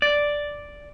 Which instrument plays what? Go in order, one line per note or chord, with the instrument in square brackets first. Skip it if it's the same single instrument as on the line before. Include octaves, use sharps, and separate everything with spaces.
[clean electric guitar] D5